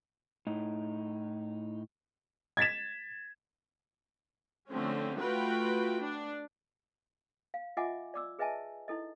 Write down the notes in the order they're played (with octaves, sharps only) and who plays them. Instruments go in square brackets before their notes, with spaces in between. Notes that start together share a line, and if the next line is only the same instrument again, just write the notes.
[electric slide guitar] A2 D#4
[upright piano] G#6 A6 B6 E7
[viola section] D3 F3 A3 C4 C#4
A3 F4 F#4 B4 G5
D4
[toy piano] F5
F4 D#5 E5 F#5 G#5 D6
D5 D6 E6
G#4 B4 D#5 E5 G#5 A5
D#4 E4 A4 D#5